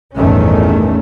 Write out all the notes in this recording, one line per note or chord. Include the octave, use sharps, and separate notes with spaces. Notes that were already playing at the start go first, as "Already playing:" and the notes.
A1 E2 G2 D#3 A3 C#4